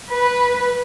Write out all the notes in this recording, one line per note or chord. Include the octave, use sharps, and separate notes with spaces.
B4